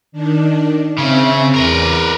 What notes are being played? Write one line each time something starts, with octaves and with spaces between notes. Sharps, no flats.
D#3 D4
C#3 C4 E5
E2 A#4 B4 D6